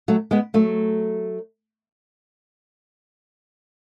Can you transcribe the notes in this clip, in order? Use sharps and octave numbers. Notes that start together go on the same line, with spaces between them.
F#3 A3
G#3 B3
F#3 A3